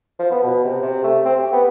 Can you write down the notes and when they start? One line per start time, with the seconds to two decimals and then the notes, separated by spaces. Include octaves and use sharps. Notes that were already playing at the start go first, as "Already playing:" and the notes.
0.19 F3
0.31 B3
0.44 B2
0.64 C3
0.82 C3
1.04 A3
1.25 C4
1.39 G4
1.53 B3